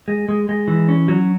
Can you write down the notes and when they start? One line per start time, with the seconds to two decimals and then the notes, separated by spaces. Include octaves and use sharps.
0.08 G#3
0.29 G#3
0.49 G#3
0.68 E3
0.89 C#4
1.08 F#3